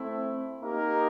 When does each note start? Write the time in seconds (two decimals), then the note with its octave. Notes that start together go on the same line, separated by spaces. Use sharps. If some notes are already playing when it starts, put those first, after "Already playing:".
Already playing: A3 C4 E4
0.62 A#3 D#4 G4 A#4